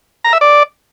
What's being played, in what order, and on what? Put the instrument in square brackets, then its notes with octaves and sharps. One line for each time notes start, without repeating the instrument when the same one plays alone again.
[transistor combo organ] A#5
E5
D5